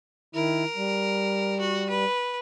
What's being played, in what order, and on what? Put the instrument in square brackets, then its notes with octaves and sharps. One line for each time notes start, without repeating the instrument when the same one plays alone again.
[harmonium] D#3 E4 [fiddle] A#4
[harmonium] G3
[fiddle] F#4
B4